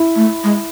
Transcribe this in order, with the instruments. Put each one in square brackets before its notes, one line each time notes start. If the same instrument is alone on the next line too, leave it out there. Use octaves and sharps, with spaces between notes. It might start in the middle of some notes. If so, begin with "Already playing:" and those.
Already playing: [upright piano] E4
[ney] A3
G#3